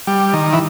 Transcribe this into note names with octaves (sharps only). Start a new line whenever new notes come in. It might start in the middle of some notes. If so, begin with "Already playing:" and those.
G3
D#3
E3